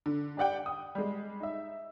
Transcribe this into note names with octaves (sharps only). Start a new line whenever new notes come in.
D3
D4 G4 D5 F#5 G5
D#6
G3 G#3
D#4 E5